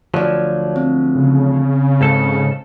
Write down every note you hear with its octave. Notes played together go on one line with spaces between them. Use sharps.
D2 F3 F#3 C#5 D5
C4
C#3
G#2 A4